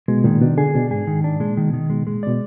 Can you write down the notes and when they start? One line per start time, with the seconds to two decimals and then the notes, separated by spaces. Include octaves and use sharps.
0.08 B2 G#3
0.24 A#2 D#3
0.41 B2 D4
0.57 D3 G#4
0.75 B2 D4
0.91 G#2 G#4
1.07 D#3
1.24 D4
1.40 A#2 G#3
1.57 D#3
1.65 B2
1.74 D#3
1.90 B2 G#3
2.02 A#2
2.07 G#3
2.14 A#2
2.23 B2 D5